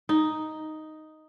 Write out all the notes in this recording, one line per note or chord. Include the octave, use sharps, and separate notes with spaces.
D#4